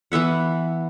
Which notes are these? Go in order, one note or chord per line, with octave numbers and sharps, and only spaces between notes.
E3 B3 E5 F#5